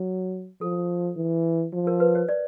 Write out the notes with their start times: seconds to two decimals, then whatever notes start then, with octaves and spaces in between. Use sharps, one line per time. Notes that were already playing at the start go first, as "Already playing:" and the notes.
Already playing: F#3
0.61 F3 A4
1.17 E3
1.73 F3
1.87 A#4
2.00 B4
2.15 C#5
2.28 D5